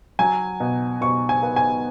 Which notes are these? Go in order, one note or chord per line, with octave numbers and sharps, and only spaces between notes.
F#3 G#5
B2
B2 C#6
G#5
B3
G#5